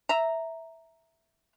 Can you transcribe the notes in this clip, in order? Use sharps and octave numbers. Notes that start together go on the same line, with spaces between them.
E5 A#5